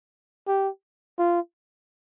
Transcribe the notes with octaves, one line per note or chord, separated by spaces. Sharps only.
G4
F4